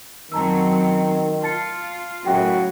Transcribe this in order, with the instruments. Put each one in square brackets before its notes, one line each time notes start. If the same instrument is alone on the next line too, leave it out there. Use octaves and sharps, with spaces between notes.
[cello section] F#2 F#3 C4 [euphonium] D#3 [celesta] A5 A#5 E6
[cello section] F4 [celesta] A5 A6 C#7
[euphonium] F#2 [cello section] A2 C#3 F#3 [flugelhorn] F#4 [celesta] G5